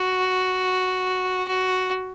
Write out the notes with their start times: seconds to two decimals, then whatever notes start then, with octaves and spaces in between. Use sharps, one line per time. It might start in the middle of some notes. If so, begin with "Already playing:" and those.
Already playing: F#4
1.47 F#4